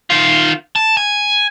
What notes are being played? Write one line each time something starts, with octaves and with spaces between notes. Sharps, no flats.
D#3 F4
A5
G#5